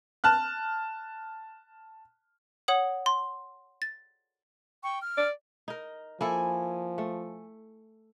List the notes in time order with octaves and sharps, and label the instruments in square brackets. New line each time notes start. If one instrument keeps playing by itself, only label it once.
[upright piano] A5 F6 F#6
[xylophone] C#5 F#5 D#6 F#7
C6
A6
[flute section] G5 C#6
F6
[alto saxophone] D5
[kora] D#4 A#4
[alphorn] F3 [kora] A#3 E4 A4 [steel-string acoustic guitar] G#5
[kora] A3